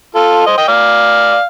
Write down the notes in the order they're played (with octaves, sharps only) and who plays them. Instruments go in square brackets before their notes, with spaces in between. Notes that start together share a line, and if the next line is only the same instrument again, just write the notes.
[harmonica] F4 A4
C5 D#5
D#5 G5
D5 F5